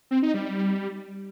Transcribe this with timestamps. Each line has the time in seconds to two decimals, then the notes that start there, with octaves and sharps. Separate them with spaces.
0.11 C4
0.23 D#4
0.34 G3